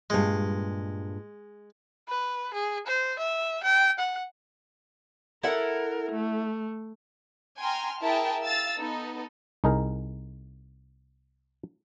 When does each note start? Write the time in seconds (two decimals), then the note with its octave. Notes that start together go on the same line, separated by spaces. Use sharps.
0.10 G2 A#2 G#3
2.08 B4
2.54 G#4
2.87 C5
3.19 E5
3.63 G5
3.99 F#5
5.43 E4 A4 A#4 F#5
6.12 A3
7.61 G5 G#5 A#5 C6 F6
8.02 E4 G#4 A#4 E5 G5 A5
8.45 F5 E6 A6
8.79 B3 D#4 A4
9.64 C2 D#4 G#4 A#4